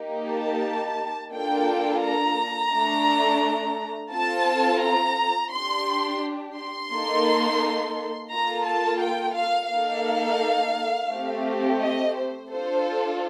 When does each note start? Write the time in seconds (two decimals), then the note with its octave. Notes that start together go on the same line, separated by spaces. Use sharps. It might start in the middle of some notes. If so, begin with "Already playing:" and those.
Already playing: A#3 D#4 G4
0.27 A5
1.32 A#3 D4 F4 A4 G5
2.02 A#5
2.72 A3 D4 A4
4.11 C4 F4 A4 A5
4.82 A#5
5.51 D4 G4 C6
6.56 C6
6.91 A#3 D#4 A4
8.31 A#3 F4 A4 A#5
8.66 A5
9.01 G5
9.36 F5
9.71 A#3 D#4 A4 F5
11.11 A3 C4 G4
11.80 D#5
12.15 C5
12.50 D4 F4 A4 C5